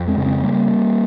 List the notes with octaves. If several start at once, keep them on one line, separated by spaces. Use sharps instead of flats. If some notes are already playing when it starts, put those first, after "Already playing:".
Already playing: F2
G#3 C4
C#3
G#3 C4
G3 A#3